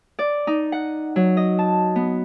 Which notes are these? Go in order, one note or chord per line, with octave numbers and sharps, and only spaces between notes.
D5
D#4
F#5
F#3
D#5
A5
B3